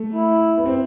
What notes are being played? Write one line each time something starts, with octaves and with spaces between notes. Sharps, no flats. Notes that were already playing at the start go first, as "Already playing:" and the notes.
Already playing: A3
E4
B3
C4